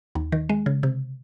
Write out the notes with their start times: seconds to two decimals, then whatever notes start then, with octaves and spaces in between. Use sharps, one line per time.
0.15 D#2
0.32 D#3
0.49 G#3
0.66 C#3
0.83 C3